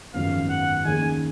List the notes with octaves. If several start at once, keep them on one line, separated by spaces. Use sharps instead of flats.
G#1 F#2 C#3 F3 B3 F5
F#5
D#2 D#3 A#3 C#4 G#4 G#5